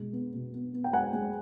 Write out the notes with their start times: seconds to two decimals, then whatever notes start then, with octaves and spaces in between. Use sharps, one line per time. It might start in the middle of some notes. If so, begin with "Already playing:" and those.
Already playing: B2 G#3
0.13 B3
0.34 B2
0.54 B3
0.74 B3
0.84 G5
0.93 G#3 F#5 G#5
1.13 G#3